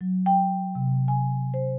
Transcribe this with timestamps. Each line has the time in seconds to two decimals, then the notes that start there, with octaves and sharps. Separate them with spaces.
0.01 F#3
0.26 G5
0.75 C3
1.08 G#5
1.54 C5